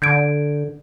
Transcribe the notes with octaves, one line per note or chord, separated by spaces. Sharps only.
D3 G6 G#6 D7